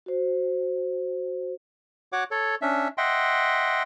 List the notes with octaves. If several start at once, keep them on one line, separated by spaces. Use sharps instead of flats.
F#4 C5
F#4 C#5 F#5 D6
A4 C#5
C#4 D4 E5
D#5 E5 F#5 G5 C6